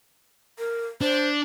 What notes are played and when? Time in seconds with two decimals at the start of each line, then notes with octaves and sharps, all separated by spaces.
0.59 A#4
1.01 D4 C5